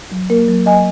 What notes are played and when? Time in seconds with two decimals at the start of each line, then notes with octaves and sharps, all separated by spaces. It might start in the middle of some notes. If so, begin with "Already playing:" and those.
0.12 F#3
0.30 A#3 A#4
0.48 F#3
0.66 F#3 D#5 G#5